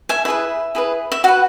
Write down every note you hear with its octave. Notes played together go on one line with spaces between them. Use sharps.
E5 G#5
E4 G#4 B4 E5
E4 G#4 B4
E5
F#4 B4 F#5